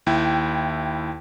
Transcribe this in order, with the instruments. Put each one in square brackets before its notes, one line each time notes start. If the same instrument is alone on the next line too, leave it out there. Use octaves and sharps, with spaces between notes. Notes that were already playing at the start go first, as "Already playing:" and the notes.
[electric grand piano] D#2 E4 G5